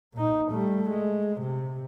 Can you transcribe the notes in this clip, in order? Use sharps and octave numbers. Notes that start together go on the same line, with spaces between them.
A#2 D#4
G3 A3
G#3
C3